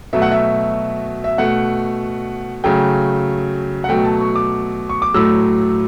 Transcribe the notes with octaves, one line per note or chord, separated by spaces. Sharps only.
B2 F#3 A3 E5
F#5
E5
E5
B2 A3 F#5
C#3 F#3 A3 G5
F#5
B2 F#3 A3 G5
A5
C#6
D6
C#6
D6
A2 F#3 A3 E6